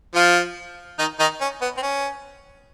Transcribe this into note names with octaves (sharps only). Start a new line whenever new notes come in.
F3 F4
D#3 D#4
D#3 D#4
C#4
B3
C4
C#4